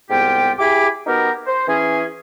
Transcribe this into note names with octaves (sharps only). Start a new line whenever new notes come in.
C2 G#2 B3 F4 G4 G5
E4 G4 G#4 G#5 B5 D6
B3 D#4 F#4 G4 A#4
C5
E3 C#4 G#4